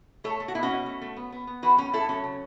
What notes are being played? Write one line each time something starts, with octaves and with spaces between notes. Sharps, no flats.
A3 A4 C#5
A3
F#4
B2 E4
C#4 F#4
B2
A3
A3
B3
B3
B3
E3 F#4 B4
A2 C#4
A2 E4 A4
F#3 C#4
C#3